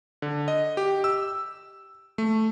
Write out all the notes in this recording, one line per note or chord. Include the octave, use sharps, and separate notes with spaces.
D3
D#5
G4
E6
A3